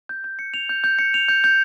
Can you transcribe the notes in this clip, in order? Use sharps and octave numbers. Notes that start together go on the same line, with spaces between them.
G6
G6
C#7
F7
G6
G6
C#7
F7
G6
G6